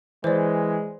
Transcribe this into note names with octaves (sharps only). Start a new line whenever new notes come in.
E3 G#3 C5 D5